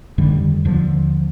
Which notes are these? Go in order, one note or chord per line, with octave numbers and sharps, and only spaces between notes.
F2 D3 D#3 G3
D#2 D3 F3